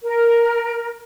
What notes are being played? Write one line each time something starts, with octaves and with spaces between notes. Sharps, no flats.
A#4